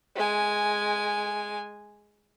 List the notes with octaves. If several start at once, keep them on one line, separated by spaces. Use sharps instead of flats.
G#3 G#5